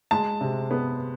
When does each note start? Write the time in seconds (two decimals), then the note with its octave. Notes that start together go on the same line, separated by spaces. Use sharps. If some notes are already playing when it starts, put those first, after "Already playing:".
0.11 G#3 A5
0.41 C3
0.71 B3